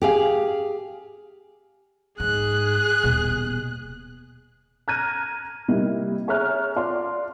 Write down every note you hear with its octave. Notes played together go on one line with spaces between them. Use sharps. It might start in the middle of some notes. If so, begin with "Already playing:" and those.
G4 G#4 F5
G#2 G#4 F#6
D#1 B2
A#5 F6 F#6 G#6 A#6 D#7
C3 G3 A#3 D#4 E4
G#4 C#5 E5 A#5 F6 F#6
F4 D5 C6